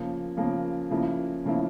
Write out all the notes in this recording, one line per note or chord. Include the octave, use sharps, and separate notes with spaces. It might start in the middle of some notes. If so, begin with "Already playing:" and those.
Already playing: C#3 F3 A#3
C#3 F3 A#3
C#3 F3 A#3 E4
C#3 F3 A#3 E4